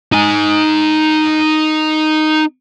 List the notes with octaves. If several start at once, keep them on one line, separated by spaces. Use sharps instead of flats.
D#4 G#5